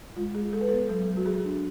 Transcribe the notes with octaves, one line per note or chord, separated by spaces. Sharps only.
G#3 F4
G#3 G#4
G#3 A4
B4
B3 A4
F#3 A4
F#3
F#4
F#3 G#4
D4